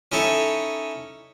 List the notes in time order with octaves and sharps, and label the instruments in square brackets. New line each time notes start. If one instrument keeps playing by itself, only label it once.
[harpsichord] C#4 D#4 E4 A4 C#5